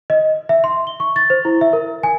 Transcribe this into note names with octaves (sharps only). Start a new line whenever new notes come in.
D#5
E5
C6
G7
C#6
A6
C5
E4
E5
A#4
G#5